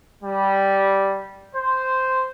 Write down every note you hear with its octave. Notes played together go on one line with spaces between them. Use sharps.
G3
C5